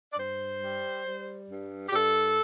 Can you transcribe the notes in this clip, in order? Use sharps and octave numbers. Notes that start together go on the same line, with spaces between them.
D5
G2 C5
G3
G3
G2
G4
G2 A4